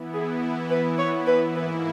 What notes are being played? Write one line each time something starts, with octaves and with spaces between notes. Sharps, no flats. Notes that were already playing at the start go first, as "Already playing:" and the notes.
Already playing: E3 B3 E4
G#4
B4
C#5
B4
G#2 E3 A#3 E4 B4